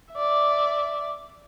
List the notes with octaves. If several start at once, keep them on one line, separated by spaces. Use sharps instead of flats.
D5 E5